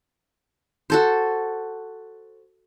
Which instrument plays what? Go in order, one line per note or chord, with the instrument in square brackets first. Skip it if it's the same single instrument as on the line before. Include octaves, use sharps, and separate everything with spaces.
[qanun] F#4 A4 C5